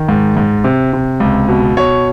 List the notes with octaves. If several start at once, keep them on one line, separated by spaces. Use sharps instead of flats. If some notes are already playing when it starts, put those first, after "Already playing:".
Already playing: D#3
G#2
G#2
C3
C3
C#2
B2
B2 C#5